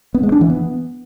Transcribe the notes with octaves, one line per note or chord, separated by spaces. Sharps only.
B3
G#3
D4
E3
B3